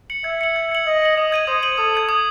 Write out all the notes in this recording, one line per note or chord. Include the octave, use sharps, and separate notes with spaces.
C#7 F#7
E5 G#6
C#7 F#7
G#6
C#7 F#7
D#5 G#6
C#7 F#7
D#5 D#6
G#6 D#7 F#7
C5 D#6
G#6 D#7 F#7
A4 D#6
G#6 D#7 F#7
D#6